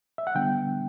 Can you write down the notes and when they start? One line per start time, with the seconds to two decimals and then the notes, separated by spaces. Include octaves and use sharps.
0.18 E5
0.27 F#5
0.35 D3 G3 B3 D4 G5